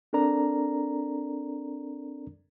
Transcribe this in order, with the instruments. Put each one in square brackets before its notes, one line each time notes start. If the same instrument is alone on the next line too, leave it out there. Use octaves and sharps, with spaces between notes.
[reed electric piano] C4 D4 A4 A#4 D5 A#5